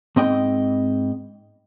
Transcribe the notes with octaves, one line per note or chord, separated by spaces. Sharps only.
G#2 C4 D#5 G5